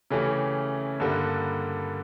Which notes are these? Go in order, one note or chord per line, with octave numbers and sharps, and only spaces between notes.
C#3 E3 A3 C#4 G4
G2 D3 G3 A#3